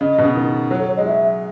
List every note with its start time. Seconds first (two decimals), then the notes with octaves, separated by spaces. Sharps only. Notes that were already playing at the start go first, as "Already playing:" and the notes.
0.01 C#3 D#5
0.18 B2
0.24 C#3
0.36 D#3
0.71 F#3 C#5
0.79 A4
0.88 C#5
0.97 G#3 D#5
1.05 F#3 E5